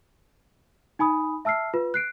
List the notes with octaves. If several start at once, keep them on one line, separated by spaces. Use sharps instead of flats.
D#4 G#5 B5 D#6
E5 A5 E6 F6 C7
F4 B4
F#6 C7 D7